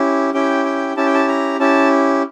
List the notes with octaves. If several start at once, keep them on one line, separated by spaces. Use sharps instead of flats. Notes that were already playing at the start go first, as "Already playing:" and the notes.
Already playing: C#4 E4 G4
C#4 E4 G4 G5
G5
C#4 E4 G4 A5
G5
A5
A#5
C#4 E4 G4 A5